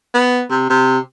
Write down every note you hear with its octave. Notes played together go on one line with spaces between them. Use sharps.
B3
C3
C3